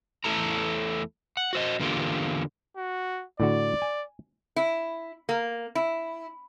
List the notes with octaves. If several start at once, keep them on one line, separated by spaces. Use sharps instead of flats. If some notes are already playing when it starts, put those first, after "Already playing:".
E2 A3 E4 A4 A#5
F#5
F#4 C5 D#5
E2 D3 A#3 F4 G4
F#4
A2 D3 F#4 D5
G#5
E4
A#3
E4